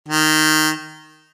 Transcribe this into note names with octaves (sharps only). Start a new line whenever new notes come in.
D#3